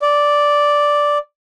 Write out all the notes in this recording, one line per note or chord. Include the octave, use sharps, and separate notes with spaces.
D5